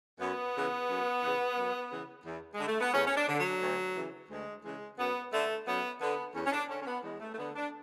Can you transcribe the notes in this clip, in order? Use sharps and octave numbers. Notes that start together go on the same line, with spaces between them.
F#2 B3
C#3 E3
F#2
C#3 E3
F#2
C#3 E3
E2
G#3
D3
A3
B3
E2 C#4
C#4
D4
D3
F#3
D2
C#3 E3
D2 G#3
C#3 E3 G#3
F#2 B3
D3 A3
F#2 B3
D3 B3
E2 C#4
C#4
D4
D3 C#4
C#4
B3
E2 G#3
A3
A3
D3 B3
D4